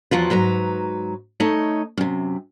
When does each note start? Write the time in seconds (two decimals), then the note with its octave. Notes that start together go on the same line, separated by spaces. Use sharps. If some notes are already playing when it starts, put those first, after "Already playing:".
0.11 E2 F3 F#3 F4 B4
0.30 G#2 F#3 B4 A#5
1.40 A3 D#4 C#5 D#5
1.98 F#2 C3